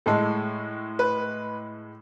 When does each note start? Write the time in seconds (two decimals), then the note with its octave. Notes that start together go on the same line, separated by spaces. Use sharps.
0.06 A2 G#3 A4
0.99 B4